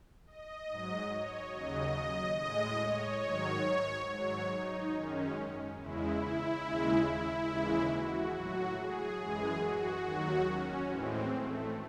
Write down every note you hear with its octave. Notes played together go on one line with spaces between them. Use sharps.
D#5
G#2 F#3
C#5
D#2 C#3 F#3 D#5
A2 G#3 D#5
C#5
G#2 D#3 F#3
G#2 F#3 C#5
D#4
F#2 D#3 G#3 C#4
E2 C#3 G#3 E4
E4
D#2 C#3 G#3
E4
D#2 C#3 E3 G#3
F#4
A2 F#3 F#4
G#4
F#2 E3 G#3 G#4
F#4
D#2 D#3 F#3 F#4
C#4
A2 E3 G#3 C4
A3